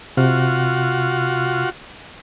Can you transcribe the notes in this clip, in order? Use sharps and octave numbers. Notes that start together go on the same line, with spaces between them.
C3 F4 F#4